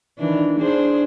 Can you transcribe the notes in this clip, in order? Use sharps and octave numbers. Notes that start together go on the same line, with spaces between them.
D#3 E3 D4
D4 G#4 C5